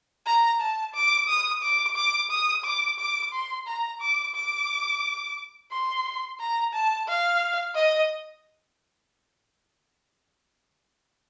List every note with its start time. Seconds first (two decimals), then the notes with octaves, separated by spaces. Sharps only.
0.26 A#5
0.60 A5
0.94 D6
1.28 D#6
1.63 D6
1.96 D6
2.31 D#6
2.65 D6
2.99 D6
3.33 C6
3.67 A#5
4.01 D6
4.35 D6
5.72 C6
6.40 A#5
6.73 A5
7.08 F5
7.75 D#5